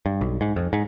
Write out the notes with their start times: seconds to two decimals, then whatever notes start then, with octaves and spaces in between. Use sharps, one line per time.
0.06 G2
0.21 B1
0.41 G#2
0.56 F2
0.73 G#2